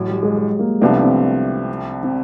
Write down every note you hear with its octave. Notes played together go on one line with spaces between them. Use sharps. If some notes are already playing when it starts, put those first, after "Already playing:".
Already playing: A1 A2 F#3
G3
G#3
G#3
A#3
C2 C3 F3 A3 B3 D4
C4
C4